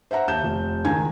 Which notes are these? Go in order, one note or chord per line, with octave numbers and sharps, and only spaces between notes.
C5 E5 F#5 A#5
D#2 A5 G6 E7
F1
C#2 D#3 G#5 A#5 G#6